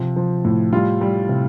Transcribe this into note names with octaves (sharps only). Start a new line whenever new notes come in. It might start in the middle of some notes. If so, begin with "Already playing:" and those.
Already playing: C3 F3
F3
A2
G3 F4
G3
C3